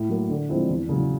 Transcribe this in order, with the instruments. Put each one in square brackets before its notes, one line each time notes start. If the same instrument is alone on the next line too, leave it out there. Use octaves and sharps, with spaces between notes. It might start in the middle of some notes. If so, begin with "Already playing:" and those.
Already playing: [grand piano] A2
F#3 A#3
D3
F3 G#3 C4 E4
E2
C#3 F#3